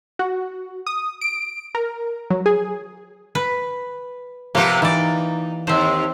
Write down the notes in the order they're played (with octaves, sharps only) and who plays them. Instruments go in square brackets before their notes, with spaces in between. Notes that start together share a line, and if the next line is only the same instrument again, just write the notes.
[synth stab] F#4
D#6
D7
A#4
F#3
G#4
[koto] B4
[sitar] C3 F3 B3 [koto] A#3 G4
[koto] E3 D5 [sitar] D#4
[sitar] D#2 [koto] C4 C5